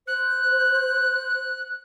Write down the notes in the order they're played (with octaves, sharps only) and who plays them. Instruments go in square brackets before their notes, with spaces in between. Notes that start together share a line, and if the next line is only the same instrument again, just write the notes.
[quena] C5 [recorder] F#6